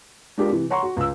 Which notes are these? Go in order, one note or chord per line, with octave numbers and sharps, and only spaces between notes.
G#3 D4 F4 G4 A#4
C3 E3
C#5 F#5 A#5 C6 C#6
F#4
C#2 E6